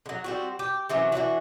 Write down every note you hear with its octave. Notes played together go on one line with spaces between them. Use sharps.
D3 F#3
G3 C4 F#4
G4
C3 E3 F#3 C#4
E3 F#3 D4 F#4